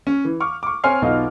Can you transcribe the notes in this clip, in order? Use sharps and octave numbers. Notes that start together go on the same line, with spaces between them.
C#4
E3
C#6 D6 F6
C#6 D6
C4 C#5 G#5 C6 F6 C7
B1 B2 D#4 F4